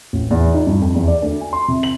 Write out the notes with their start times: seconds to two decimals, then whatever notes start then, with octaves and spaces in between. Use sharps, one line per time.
0.13 A1
0.31 E2
0.54 D#4
0.67 G2
0.82 F2
0.95 E2
1.08 D5
1.22 D2
1.41 G#5
1.53 C6
1.68 C3
1.83 F#7